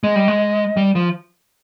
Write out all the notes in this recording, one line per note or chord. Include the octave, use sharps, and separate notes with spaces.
G#3 D#5
G3
G#3
G3
F3